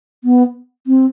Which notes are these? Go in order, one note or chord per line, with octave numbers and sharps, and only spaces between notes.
B3
C4